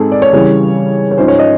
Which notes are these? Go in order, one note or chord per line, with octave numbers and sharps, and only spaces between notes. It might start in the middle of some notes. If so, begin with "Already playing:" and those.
Already playing: G#2 C4 G#4 A4
D5
C#5
C#3 E3 G3
C#5
G#2 F3 G#3 C#4 C5
C#5
D#5